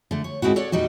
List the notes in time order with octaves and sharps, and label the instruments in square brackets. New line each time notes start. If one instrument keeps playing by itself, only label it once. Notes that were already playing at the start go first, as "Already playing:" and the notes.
[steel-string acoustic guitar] D3 A3
C#5
D2 G#2 G#3 C4 E4 F#4
A4 C#5 D5 F#5
E2 A#2 G3 D#4 F#4